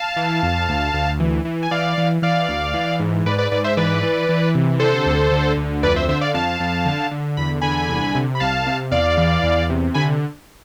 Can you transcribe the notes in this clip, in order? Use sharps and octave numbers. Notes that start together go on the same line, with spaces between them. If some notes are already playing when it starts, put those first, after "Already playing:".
Already playing: F5 A5
E3
F2
D2
D2
E3
E3
G#5
E3 D5 F5
E3
E3 D5 F5
D2
E3
G#2
G#2 B4 D5
B4 D5
G#2 B4 D5
C5 E5
E3 B4 D5
E3
E3
C3
D3 A4 C5
D2
D3
D2
F2 B4 D5
C5 E5
D3 C5 E5
D5 F5
F2 F5 A5
F2
D3
D3
E2 B5
D3 G#5 B5
C2
C3
B5
C2 F5 A5
C3
E2 D5 F5
E3
E2
C3
D3 G#5 B5